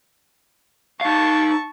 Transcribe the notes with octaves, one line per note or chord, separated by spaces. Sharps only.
D#4 F5 A5 C#6